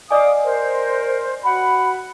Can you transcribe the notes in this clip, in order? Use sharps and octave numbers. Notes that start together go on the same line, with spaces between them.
D5 D#5 F5 G#5 D6 D#6
A#4 C5
F#4 F#5 B5